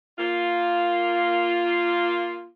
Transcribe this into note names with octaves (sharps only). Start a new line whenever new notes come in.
A#3 F4